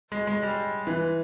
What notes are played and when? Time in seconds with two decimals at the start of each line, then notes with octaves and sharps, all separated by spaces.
0.12 G#3
0.27 G#3
0.43 G3
0.87 E3